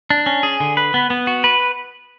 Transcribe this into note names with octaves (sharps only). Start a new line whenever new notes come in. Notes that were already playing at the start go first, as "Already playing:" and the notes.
D4
C#4
G#4
D3
B4
B3
B3
F#4
B4